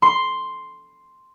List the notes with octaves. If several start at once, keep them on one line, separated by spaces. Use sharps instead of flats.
C6